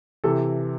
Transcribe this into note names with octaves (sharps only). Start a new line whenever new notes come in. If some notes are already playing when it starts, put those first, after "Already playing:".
C3 E3 A4